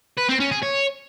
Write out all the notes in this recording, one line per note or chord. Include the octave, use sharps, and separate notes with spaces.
B4
C4
C#4
G#4
C#5